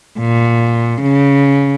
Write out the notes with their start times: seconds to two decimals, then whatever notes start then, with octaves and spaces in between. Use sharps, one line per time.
0.20 A#2
1.02 C#3